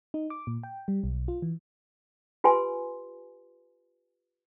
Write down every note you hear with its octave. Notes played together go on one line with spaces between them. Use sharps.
D#4
D6
A#2
G5
G3
B1
F4
E3
F4 G4 B4 G#5 C6